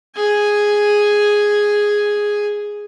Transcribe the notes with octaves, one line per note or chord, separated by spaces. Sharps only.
G#4 G#5